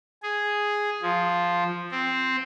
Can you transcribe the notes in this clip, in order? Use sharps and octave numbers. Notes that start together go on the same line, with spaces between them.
G#4
F3
C4